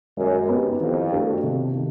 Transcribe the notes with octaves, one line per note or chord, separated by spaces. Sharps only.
F#2 G#3
B3 D#4 G4
F2 E3
A3 D4 F#4 A4
C3
D#3